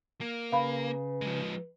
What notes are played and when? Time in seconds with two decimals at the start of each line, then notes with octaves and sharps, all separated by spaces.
0.21 A#3
0.52 C#3 B4 F5 B5
1.21 F3 G#3